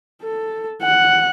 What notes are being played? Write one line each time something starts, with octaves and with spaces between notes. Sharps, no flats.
A4
F#5